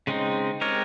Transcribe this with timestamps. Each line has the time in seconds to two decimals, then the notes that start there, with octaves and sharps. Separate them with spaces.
0.07 C#3 G#3 C4 D#4
0.61 G#3 C4 G4 A#4 C#5